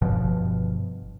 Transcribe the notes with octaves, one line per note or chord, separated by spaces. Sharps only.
G1 G2 B2 F3